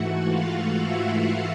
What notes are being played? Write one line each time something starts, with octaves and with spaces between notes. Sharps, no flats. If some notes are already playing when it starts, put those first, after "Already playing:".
Already playing: G#2 E3 A3 F#4 F#5
F4 F5
E4 E5